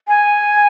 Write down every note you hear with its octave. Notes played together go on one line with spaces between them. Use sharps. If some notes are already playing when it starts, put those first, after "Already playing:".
G#5